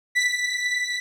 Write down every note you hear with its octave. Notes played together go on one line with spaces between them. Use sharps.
B6